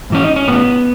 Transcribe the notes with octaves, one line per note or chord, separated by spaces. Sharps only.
G#2 E3 C#4
D#4
C#4
A2 E3 B3